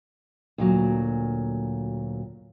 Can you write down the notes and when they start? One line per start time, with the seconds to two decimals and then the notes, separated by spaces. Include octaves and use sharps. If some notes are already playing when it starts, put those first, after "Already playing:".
0.58 D2 A#2 F#3